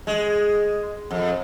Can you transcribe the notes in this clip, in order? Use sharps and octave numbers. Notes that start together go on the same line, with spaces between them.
G#3
F2